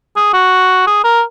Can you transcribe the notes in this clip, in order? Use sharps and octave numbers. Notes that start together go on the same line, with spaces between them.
G#4
F#4
G#4
A#4